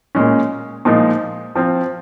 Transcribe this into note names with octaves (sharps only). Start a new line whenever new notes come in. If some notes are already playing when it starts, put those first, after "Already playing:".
A#2 G#3 C#4
A#2 F3 G#3 D#4
F3 C4 F4